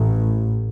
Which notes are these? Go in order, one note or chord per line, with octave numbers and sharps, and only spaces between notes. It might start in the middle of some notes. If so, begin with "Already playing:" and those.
Already playing: A1 A2